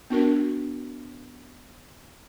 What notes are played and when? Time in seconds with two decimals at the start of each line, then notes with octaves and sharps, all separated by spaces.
0.10 B3 D4 F#4 A#4